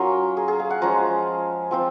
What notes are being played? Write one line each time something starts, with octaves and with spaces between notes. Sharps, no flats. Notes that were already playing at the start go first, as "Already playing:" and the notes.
Already playing: F#3 C#4 F4 A#4
G#4
G#4
F5
F#5
F3 G#3 C#4 F4 A#5
F3 C4 F4